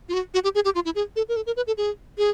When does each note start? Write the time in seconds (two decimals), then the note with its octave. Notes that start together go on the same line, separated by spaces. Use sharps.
0.09 F4
0.14 F#4
0.34 F#4
0.44 G4
0.55 G#4
0.65 G4
0.75 F4
0.85 E4
0.95 G#4
1.16 A4
1.29 A#4
1.36 A4
1.46 A#4
1.57 B4
1.67 A4
1.78 G#4
2.18 G#4